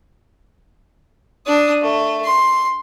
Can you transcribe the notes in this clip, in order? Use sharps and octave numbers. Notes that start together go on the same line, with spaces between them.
D4 D#6
A3
C6